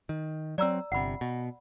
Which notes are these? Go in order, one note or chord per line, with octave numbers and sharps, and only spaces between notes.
D#3
F#3 C4 D5 A#5 E6
G1 C3 F#5 B5
B2